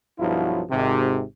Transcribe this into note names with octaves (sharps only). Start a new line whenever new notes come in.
B1 G2 F3 F#3 E4 F4
G#1 G#2 C3